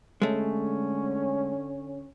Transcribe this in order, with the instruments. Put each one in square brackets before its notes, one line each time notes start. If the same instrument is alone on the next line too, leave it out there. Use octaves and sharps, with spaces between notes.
[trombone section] D3 C#4 [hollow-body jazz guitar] G#3 A3